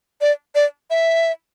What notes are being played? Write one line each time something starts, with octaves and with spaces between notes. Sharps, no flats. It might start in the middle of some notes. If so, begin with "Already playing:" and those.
D5
D5
E5